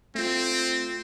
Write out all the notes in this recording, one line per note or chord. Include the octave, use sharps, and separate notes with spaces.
A3 C4 F4